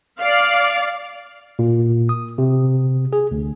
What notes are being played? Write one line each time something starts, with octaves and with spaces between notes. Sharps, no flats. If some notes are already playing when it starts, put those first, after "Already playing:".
D5 F5
A#2
D#6
C3
G#4
D2